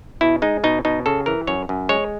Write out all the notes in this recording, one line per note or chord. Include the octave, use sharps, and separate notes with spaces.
B2 E4
G#3 D#4
B2 D#4
B2 D#4
C#3 A4
E3 A#4
F#2 C#5
F#2
G#3 C#5